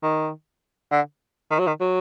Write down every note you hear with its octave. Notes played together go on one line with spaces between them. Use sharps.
D#3
D3
D#3
F#3
D#3
F#3